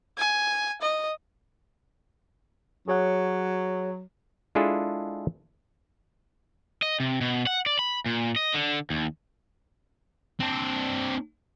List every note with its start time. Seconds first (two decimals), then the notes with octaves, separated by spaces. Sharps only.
0.18 G#5
0.81 D#5
2.88 F#3 G#4 C#5 F#5
4.55 G#3 D4 E4 F4 G#4 A4
6.82 D#5
7.00 C3
7.21 B2
7.47 F#5
7.66 D5
7.79 B5
8.06 A#2
8.36 D#5
8.54 D3
8.90 D#2
10.40 C4 D4